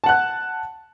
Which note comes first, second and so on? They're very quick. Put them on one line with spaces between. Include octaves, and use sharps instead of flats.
A5 F#5 F#6